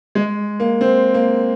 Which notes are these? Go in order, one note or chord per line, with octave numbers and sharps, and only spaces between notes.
G#3
A#3
C4
A#3